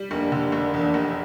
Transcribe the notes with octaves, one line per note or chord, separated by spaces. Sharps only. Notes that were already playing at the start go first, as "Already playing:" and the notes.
Already playing: G3
F1 A#3 D4
D3
F1
E2 A#3 D4
F1